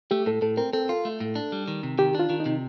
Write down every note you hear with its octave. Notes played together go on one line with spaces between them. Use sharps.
A3 G4
A2 A4
A2 A4
C4 A#4
C4 A4
F4
A3
A2
D4
G3
D#3
C3
D#3 G4
D4 F4
D#3
D#4
C3